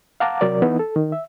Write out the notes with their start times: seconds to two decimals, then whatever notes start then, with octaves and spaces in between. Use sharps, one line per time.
0.20 F5 F#5 A5 A#5 D6
0.41 C3 F#3 A#4 D5
0.62 E3 B3 D#4
0.79 A4
0.96 D#3
1.12 E5